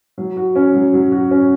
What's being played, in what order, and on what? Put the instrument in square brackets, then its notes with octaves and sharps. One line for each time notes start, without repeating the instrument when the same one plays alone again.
[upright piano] F#3
F#4
C#4
F#3
F#3
F#4
C#4